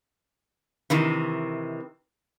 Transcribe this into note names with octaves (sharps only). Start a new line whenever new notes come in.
C3 D#3 E3